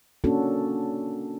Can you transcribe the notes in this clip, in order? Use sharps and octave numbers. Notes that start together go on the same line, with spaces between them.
A#3 C#4 D4 F#4 A4